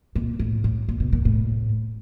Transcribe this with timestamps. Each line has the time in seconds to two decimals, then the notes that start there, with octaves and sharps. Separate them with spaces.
0.15 A#2
0.39 A2
0.64 A2
0.89 A#2
1.00 B2
1.13 A#2
1.25 A2